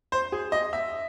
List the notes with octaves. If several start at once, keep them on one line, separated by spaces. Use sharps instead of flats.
C5
G#4
D#5
E5